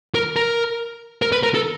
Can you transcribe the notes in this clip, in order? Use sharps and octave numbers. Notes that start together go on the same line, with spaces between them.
A#4
A#4
A#4
B4
A#4
A4